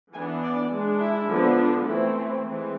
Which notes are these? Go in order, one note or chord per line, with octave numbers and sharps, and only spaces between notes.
E3 B3 D4 G#5
D5
G#3 D4
E4
D3 F3 B3 D4
D4
E3 A3 C4 E4
E4
E3 G#3 C4